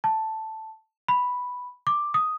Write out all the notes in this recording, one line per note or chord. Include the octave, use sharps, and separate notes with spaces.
A5
B5
D6
D#6